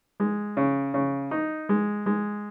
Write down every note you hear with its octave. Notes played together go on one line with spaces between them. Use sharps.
G#3
C#3
C#3
D#4
G#3
G#3